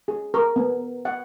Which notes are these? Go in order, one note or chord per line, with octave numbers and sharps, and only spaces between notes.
G#4
A#4
B3
F#5